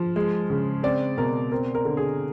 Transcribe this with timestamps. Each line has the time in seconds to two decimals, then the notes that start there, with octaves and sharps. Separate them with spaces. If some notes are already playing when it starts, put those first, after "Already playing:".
Already playing: F3
0.16 G#3
0.50 C#3
0.83 C4 D5
1.17 B2 A#4
1.52 C4 A#4
1.75 A#4
1.85 D3
1.97 G#4